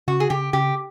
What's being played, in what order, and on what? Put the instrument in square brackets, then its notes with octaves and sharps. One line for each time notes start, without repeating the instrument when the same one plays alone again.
[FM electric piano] C#3 [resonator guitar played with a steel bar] F#4
[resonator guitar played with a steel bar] G#4
[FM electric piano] C#3 [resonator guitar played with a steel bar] G4
[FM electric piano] C#3 [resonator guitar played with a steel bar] G4